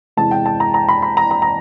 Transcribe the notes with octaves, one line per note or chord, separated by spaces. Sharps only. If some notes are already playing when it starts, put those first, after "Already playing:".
E2 C3 E3 G#3 A5
G5
A5
A#5
A#5
B5
B5
A#5
A#5
A#5